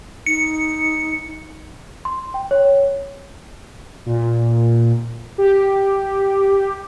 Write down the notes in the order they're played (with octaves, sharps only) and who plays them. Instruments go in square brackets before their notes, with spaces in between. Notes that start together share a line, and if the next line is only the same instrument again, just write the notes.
[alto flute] D#4 [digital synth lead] C#7
[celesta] C6
G5
C#5
[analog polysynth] A#2
G4